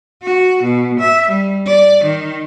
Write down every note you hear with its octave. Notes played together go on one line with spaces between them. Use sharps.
F#4
B2
E5
G3
D5
D#3